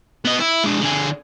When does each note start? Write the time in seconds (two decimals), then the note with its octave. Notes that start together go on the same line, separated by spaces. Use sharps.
0.25 B3 D#5
0.40 E4
0.64 G#3 D4
0.81 D3 G#4